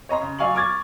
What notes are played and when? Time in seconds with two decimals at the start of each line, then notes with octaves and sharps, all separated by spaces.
0.09 C#5 D#5 A#5 C6
0.21 C#3
0.39 F#3 D5 F5 G#5 C#6 F#7
0.55 C#6 D6 F6 G#6 A6